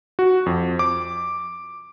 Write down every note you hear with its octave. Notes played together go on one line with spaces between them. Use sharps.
F#4
F2
D6